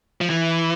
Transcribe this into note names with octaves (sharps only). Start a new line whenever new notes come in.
F3
E3